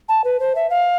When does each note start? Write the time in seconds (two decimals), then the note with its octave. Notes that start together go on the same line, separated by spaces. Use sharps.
0.08 A5
0.24 B4
0.40 C5
0.55 E5
0.70 F5